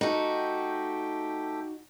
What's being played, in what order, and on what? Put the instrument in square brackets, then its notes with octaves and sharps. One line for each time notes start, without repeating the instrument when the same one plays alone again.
[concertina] A3 G4 G5 [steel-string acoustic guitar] D#4 F#4